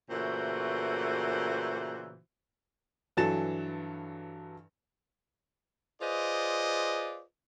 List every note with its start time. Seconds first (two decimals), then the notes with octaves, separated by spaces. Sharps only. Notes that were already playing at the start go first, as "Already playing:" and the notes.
0.10 A#2 C#3 E3 A3 F#4 C5
3.17 G2 E3 F#3 A4 A6 E7
6.02 F4 G#4 B4 C5 D5 D#5